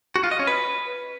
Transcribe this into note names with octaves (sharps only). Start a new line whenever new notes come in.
F#4
F4
D#5
C#4
B4